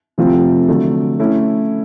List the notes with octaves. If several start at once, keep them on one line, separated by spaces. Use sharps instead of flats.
C3 F3 A3 C4 F4
D3 F#3 A3
A3 C#4 E4